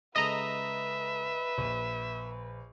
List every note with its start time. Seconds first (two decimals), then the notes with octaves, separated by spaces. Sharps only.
0.16 C#3 G#3 A4 B4 D#5 E5 A#5
1.58 A#1 D#7